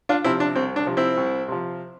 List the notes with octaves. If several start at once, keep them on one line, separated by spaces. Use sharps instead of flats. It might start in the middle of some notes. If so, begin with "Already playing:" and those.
D4 F4
C3 F3 C4 E4
D4
C2 C4
D4
C3 F3
C4 E4
C2
C3 F3